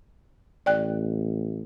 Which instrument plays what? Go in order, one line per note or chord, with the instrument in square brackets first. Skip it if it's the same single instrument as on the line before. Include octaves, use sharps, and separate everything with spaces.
[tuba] A1 [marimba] D5 G5 F#6